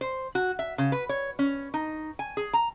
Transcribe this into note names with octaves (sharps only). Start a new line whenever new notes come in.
C5
F#4
E5
C#3
B4
C#5
C#4
D#4
G#5
G#4
A#5